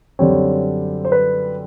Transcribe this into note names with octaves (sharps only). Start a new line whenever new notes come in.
F#2 D3 G3 C4 C#5
C5
B4